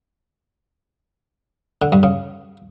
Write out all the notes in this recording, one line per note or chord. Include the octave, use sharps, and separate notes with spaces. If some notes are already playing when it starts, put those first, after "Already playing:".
D3
G2
C#3